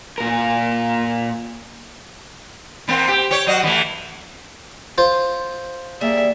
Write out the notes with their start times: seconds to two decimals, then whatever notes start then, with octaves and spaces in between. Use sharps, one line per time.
0.18 A#2 A#4
2.88 E3 A#3 C4
3.08 G4
3.31 G4 C#5
3.47 F#3 F#4 D#5
3.63 E3 A3
4.98 F4 C5
6.01 G3 A#3 G#4 E5